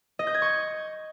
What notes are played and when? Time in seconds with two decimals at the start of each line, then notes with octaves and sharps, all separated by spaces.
0.19 D#5
0.27 G6
0.34 G#6
0.42 C#6